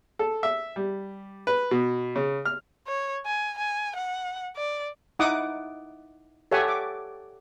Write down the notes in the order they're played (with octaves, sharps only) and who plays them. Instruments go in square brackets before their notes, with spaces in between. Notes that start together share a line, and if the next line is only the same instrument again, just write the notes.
[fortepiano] A4
E5
G3
B4
B2
C#3
F6
[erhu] C#5
G#5
G#5
F#5
D5
[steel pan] D#4 E4 F#5 D6 D#6
G4 A4 C#5 E5 F#5 G#5
D6